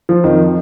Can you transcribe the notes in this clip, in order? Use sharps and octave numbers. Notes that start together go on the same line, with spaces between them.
F3
F2 D#3